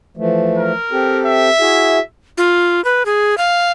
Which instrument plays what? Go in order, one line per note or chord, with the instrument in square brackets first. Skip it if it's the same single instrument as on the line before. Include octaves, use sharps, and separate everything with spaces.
[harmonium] E3 F3 A3
[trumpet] A#4
[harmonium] C4 G4 A4
[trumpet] E5
[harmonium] E4 F#4 G#4
[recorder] F4
B4
G#4
F5